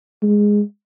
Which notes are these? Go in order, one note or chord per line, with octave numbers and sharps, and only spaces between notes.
G#3